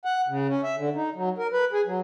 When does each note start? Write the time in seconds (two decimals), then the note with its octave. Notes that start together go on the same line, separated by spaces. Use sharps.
0.05 F#5
0.28 C#3
0.48 C#4
0.64 E5
0.77 D3
0.96 D#4
1.15 F#3
1.38 A#4
1.53 B4
1.73 G#4
1.86 F#3